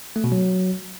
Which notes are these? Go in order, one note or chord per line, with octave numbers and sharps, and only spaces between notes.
A3
B2
F#3